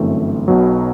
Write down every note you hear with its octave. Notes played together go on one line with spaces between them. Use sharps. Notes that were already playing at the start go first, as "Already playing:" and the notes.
Already playing: G1 F#2 E3 A3 C4
B1 B2 F#3